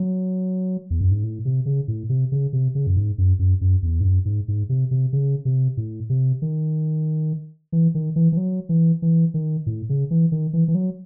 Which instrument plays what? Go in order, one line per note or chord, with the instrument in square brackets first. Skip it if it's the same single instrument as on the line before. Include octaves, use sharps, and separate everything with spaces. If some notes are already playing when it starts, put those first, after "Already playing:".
Already playing: [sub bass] F#3
E2
F#2
G#2
A2
C3
C#3
A2
C3
C#3
C3
C#3
F#2
G#2
F#2
F#2
F#2
E2
G#2
F#2
G#2
G#2
C3
C3
C#3
C3
A2
C3
D#3
E3
D#3
E3
E3
F#3
E3
E3
D#3
A2
C#3
E3
D#3
E3
E3
F#3